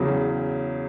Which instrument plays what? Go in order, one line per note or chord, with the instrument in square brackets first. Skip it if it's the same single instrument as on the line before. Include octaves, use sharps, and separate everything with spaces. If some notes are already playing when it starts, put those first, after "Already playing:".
Already playing: [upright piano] E2 C#3 F#3 G#4